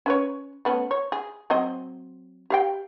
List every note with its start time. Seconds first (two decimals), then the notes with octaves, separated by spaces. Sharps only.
0.06 C#4 B4 C#5
0.65 A3 B3 C#4
0.91 C#5
1.12 G#4
1.50 F#3 C4 D#5
2.50 G4 F5 G5